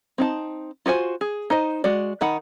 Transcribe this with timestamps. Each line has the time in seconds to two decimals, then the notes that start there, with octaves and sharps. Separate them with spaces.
0.18 C4 D#4 A5
0.86 F4 F#4 C5 G#5
1.21 G#4
1.50 D#4 C5 D#5
1.84 G#3 F#4 D5
2.21 D#3 D#4 F#5 B5